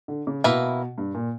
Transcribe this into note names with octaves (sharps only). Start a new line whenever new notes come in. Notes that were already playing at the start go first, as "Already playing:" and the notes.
D3
C#3
B2 A#3 E4 B4
G2
A#2